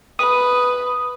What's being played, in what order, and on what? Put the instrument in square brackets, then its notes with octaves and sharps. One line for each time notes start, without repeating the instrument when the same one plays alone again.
[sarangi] B4 [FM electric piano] D#6